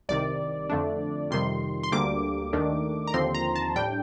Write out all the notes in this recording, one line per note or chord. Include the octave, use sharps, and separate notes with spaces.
C2 C3 D#3 D5
F2 D3 A3 D4
F2 C3 D#3 G3 C6
C6
D2 D3 G3 A#3 D6
D#2 D#3 A3 D4
A#5
D#2 D3 F3 C4 C6
A#5
A5
A2 G3 D4 G5